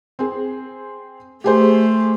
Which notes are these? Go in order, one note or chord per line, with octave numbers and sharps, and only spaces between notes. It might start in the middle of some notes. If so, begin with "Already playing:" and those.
C4 G#4
A3 G4 G#4 C5